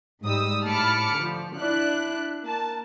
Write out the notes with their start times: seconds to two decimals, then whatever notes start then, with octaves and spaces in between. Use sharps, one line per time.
0.23 G#2 G3 D#6 E6
0.63 A2 A5 B5 D6 F6 C#7
1.14 D3 F3
1.56 D4 E4 F#6
2.44 A#3 A5